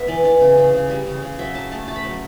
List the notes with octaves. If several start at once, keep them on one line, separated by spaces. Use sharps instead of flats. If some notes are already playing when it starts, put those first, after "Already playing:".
Already playing: B3 B4 E5
E3 D5
E3 D5
C#3
C#3
C#3
G3
C#3
C#3
F#3 E5
F#3 A5
A3 A5
A3 A5
B5
F#3 A5